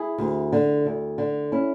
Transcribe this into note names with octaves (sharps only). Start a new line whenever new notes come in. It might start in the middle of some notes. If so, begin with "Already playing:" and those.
Already playing: E4 G#4
D2
D3
D2
D3
C#4 E4